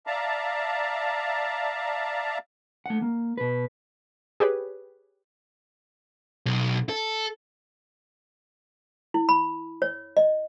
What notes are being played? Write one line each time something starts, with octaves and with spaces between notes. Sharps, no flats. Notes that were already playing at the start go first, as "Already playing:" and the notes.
D5 E5 F5 A5 A#5
A3 F#5
A#3
B2 B4
G4 G#4 B4 C#5
B1
A4
E4
B5
C#5
D#5